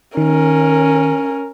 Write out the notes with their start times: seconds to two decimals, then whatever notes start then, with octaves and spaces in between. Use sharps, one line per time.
0.17 D#3 C#4 A#4